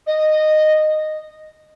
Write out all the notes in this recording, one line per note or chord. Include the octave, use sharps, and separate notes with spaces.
D#5